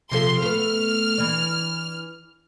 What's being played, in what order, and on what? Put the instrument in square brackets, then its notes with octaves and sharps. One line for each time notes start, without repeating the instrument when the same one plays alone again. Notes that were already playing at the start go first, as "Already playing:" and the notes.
[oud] C3 F3 A4 [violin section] C6
[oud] A3 B3 [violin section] F6
[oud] E3 D4